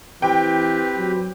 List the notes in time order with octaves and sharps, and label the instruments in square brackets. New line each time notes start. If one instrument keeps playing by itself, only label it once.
[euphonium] E3 [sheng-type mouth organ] C4 G4 B4 [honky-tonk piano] G5
[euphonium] F#3